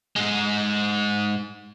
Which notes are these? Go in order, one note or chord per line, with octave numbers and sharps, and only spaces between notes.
G#2 G#3